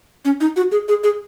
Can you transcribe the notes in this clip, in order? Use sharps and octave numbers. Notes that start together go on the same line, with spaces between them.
C#4
D#4
F#4
G#4
G#4
G#4